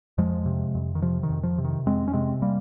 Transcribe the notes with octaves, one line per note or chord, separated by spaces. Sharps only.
F2 F3 G#3
C3
F2
D#3
C3 F3
D#3
F2
F3
C3
D#3
F2 G#3 C4
C#4
C3 G#3 C4
G3 A#3